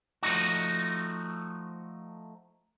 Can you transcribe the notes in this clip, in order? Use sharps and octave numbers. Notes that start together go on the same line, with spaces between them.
F3 A3 D#4 F#4